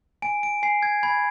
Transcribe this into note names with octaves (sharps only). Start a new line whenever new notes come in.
G#5 D7
D7
G#5 C7
G#6
B5 G#6